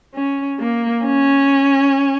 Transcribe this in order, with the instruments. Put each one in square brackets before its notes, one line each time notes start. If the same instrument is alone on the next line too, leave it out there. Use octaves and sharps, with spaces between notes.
[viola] C#4
A#3
C#4